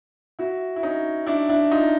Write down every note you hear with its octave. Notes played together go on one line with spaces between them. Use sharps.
E4 F#4
E4
C#4 D#4
D4 E4
D4 E4
D#4 F4